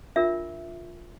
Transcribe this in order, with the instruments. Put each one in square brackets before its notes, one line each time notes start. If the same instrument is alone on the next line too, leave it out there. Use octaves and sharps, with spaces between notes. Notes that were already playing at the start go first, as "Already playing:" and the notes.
[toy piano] D4 F4 A#4 E5